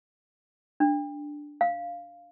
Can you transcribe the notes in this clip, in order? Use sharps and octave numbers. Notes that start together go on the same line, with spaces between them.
D4
F5